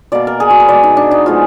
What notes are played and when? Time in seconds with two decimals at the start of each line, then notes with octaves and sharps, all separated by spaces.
0.12 B2 A#3 D5
0.27 A#4
0.40 G#4
0.50 F#4
0.60 B4
0.69 B2 G#3 B3 D5
0.83 D#4
0.97 D4
1.11 D#4
1.26 A#2 F3 G#3 B3 F4